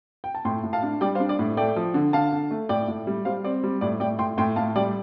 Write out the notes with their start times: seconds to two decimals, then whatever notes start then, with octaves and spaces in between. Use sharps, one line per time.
0.24 G5
0.35 A5
0.45 A2 G5 C6
0.63 A2
0.73 F5 A5
0.83 D4
1.01 G3 D5 G5
1.15 C5 F5
1.20 D4
1.29 D5
1.39 A2
1.57 A3 D5 G5
1.76 F3
1.94 D3
2.13 D3 F5 A5
2.32 D3
2.51 A3
2.69 A2 D5 G5
2.88 A2
3.07 G3
3.25 G3 C5 F5
3.44 C4 D5
3.64 G3
3.81 A2 D5
4.00 A2 D5 G5
4.19 A2 G5 C6
4.38 A2 G5 C6
4.56 A2 F5 A5
4.76 G3 D5 G5